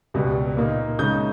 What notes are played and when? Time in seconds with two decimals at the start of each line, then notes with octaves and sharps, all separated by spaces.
0.14 C#2 B2 G3 B3
0.57 A#2 A#3 D#4
0.99 C#3 G#3 D#4 D#6 G6